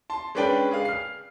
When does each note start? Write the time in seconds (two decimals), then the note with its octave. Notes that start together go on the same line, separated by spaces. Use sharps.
0.10 A5 C6
0.35 G#3 C#4 D4 B4 D5 G5
0.71 G#4 F5
0.85 F6 C7